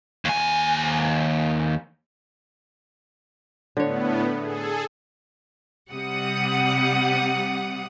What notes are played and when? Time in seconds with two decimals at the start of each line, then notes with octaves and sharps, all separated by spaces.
0.25 D#2 G#5
3.77 A2 D3 B3 C#5
4.40 G#4 A4
5.91 C3 G3 F#5 D#6